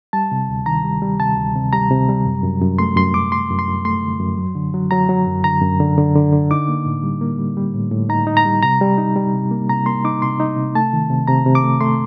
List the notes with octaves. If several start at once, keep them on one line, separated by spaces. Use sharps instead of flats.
G3 A5
C3
D2
D#3 A#5
G3
G3
C3 A5
D2
C3
G3 A#5
C3
G3
F#2
F#2
F#2
A3 C6
F#2 C6
F#2 D6
F#2 C6
F#2
C6
F#2
A3 C6
D3
F#2
F#3
D3
F#3
F#3 A#5
F#3
F#2
D3 A#5
F#2
D3
D3
D3
D3
D#4 D6
A#3
A2
G3
A#3
G3
G3
A2
A2
D#4 A#5
D#4
A#5
G3
C3 A#5
G3
D#4
G3
C3
A#3
C3 A#5
A#3 C6
D#4 D6
C3 C6
D#4
C3
A3 A5
D#3
C3
C3 A#5
C3
D6
A3
A3 C6